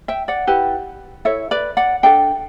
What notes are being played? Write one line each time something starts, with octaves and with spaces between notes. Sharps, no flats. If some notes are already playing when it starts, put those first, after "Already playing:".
E5 G5
D5 F#5
E4 G4 B4
E4 A4 C#5 E5
B4 D5
D5 F#5
D4 A4 E5 G5